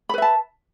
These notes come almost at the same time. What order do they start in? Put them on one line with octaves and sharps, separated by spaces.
B5 B4 E5 A5